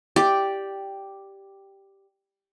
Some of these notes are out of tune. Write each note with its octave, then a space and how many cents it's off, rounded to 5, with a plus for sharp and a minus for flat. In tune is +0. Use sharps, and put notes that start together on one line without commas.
G4 +0 D5 +0